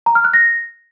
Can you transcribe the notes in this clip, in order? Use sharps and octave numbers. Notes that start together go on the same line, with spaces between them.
A#5
F6
F#6
A#6